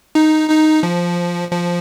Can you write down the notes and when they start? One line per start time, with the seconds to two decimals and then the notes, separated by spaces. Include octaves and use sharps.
0.15 D#4
0.50 D#4
0.83 F3
1.52 F3